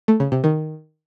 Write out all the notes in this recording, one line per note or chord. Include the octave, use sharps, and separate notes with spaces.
A3
C#3
C3
D#3